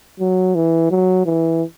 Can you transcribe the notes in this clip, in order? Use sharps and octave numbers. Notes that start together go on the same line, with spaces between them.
F#3
E3
F#3
E3